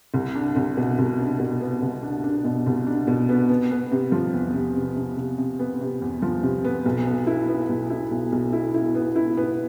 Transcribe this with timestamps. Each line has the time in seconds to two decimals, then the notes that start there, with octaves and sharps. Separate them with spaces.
0.14 C2
0.35 D4
0.56 C2
0.77 B2
0.98 C2
1.19 D4
1.39 B2
1.61 B3
1.82 C2
2.03 D4
2.24 D4
2.45 B2
2.66 C2
2.87 D4
3.07 B2
3.29 B3
3.49 B3
3.71 B3
3.91 C3
4.12 F3
4.33 E2
4.54 C3
4.76 C3
4.96 C3
5.17 C3
5.38 C3
5.59 B3
5.81 C3
6.02 E2
6.22 F3
6.43 C3
6.64 B3
6.85 B1
7.06 B3
7.27 E4
7.48 B3
7.69 B1
7.90 E4
8.11 B1
8.32 B1
8.53 E4
8.74 E4
8.95 B3
9.16 E4
9.37 B3